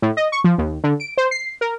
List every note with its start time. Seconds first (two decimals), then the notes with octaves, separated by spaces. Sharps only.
0.02 A2
0.17 D#5
0.32 C#6
0.44 F3
0.58 D#2
0.84 D3
1.00 D7
1.17 C5
1.31 C7
1.61 A#4